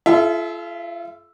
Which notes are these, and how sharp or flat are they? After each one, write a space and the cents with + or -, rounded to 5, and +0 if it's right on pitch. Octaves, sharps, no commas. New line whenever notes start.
F4 -35 A4 -40 E5 +0